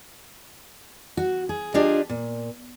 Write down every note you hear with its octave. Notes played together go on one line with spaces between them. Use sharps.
F#4
G#4
D4 F4 G4 G#4 D5 D#5
A#2